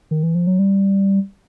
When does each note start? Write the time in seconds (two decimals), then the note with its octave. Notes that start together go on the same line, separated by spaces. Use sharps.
0.11 D#3
0.23 E3
0.35 F3
0.47 F#3
0.59 G3